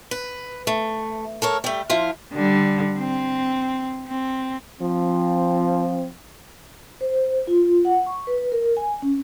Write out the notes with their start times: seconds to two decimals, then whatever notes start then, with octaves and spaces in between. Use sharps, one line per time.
0.11 B4
0.67 A3
1.42 A4 A#4 C#5
1.64 G3 A3
1.90 F3 E4 F4
2.33 D3 G3
2.98 C4
4.08 C4
4.81 F3 C4
7.01 C5
7.47 F4
7.85 F#5
8.06 C#6
8.27 B4
8.52 A#4
8.77 G#5
9.02 C#4